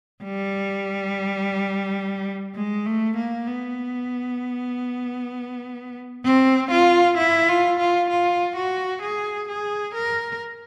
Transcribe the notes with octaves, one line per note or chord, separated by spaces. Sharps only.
G3
G#3
A3
A#3
B3
C4
F4
E4
F4
F4
F4
F#4
G#4
G#4
A#4